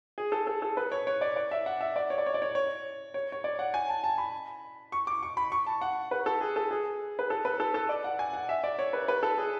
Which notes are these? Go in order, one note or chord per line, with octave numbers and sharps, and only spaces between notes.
G#4
A4
A4
A4
B4
C#5
C#5
D5
D5
E5
F#5
E5
D5
C#5
D5
C#5
D5
C#5
C#5
C#5
C#5
D5
F#5
G#5
A5
A5
B5
C#6
D6
C#6
B5
C#6
A5
F#5
B4
A4
G#4
A4
G#4
B4
A4
B4
A4
A4
D5
F#5
G#5
F#5
E5
D5
C#5
B4
B4
A4
G#4